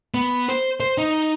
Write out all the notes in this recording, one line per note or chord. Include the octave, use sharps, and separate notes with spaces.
B3
C5
C5
D#4